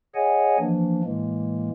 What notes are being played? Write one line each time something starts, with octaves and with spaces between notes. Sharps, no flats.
G#4 C#5 D#5 F#5 G#5
E3 F3 A#3 D4
A2 E3 G#3 A#3